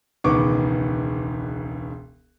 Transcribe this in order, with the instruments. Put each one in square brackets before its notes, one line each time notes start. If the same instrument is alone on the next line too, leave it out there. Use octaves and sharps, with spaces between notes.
[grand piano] E1 C#2 D#3 B3 C#6 D6